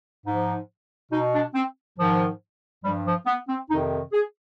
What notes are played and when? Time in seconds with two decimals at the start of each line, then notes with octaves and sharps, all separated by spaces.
0.26 G#2 F3 D#4
1.12 B2 D#4
1.34 D4
1.55 C4
1.98 G#2 D#3 F3
2.84 G2 F3 G3
3.06 F3
3.26 B3
3.48 C4
3.70 F2 C3 D#3 D#4
4.13 G#4